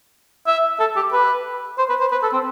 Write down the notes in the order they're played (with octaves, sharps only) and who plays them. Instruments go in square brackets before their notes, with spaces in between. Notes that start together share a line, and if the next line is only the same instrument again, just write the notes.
[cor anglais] E5
A4
G4
B4
C5
B4
C5
B4
A4
C4